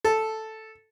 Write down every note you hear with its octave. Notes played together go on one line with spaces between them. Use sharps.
A4